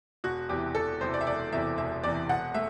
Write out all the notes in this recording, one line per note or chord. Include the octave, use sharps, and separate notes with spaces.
E1 F#4
E2 C3 E3 G4
E1 A4
E2 C3 E3 C5
D5
E5
E1 D5
E2 C3 E3 E5
E1 E5
E2 C3 E3 D5
E1 F#5
A3 E5